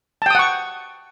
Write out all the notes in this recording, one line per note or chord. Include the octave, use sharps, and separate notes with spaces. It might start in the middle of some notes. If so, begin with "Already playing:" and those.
F#5 G5 A5 C#6 D#6